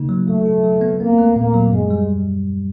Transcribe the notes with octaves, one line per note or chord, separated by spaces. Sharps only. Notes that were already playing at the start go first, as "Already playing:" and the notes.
Already playing: C#3 A#3 D#4
F#3
F#3 A3
E4
F#3
B3
A#3 C4
A3
A#2 A#3
F#3
F#2 G#3
G3